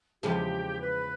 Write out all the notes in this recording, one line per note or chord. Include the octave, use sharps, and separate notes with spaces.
E2 C#3 F3 G#3 G4
B4